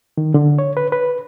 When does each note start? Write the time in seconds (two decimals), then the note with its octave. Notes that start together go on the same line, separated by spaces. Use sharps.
0.18 D#3
0.34 D3
0.59 C#5
0.77 B4
0.92 B4